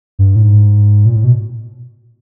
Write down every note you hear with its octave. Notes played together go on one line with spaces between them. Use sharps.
G2
A2
G#2
A#2
A2
B2